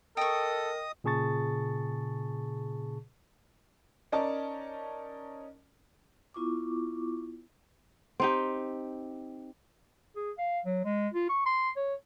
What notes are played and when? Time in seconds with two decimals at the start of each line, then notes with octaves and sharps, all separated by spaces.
0.17 A4 A#4 D#5 G5 C#6 D#6
1.04 A#2 C#3 G#4 A5 C#6 A6
4.12 C#4 D#4 A#4 D5 A5
6.34 B3 E4 F4 C#6 D6
8.20 C4 D#4 G4
10.16 G#4
10.38 F5
10.65 F#3
10.85 G#3
11.13 F4
11.29 C#6
11.46 C6
11.76 C#5